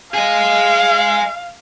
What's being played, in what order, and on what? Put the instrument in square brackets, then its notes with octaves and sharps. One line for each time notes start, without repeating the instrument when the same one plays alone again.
[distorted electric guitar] G#4 D#5 [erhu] F5